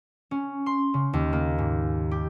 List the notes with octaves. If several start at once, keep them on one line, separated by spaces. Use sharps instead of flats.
C#4
C6
C#3
D#2
A#3
G#2
G4